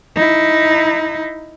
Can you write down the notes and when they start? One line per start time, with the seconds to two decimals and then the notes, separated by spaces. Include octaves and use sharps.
0.16 D#4 E4